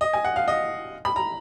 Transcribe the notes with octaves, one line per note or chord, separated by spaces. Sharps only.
D#5
G#5
F#5
F5
D#5
B5
A#5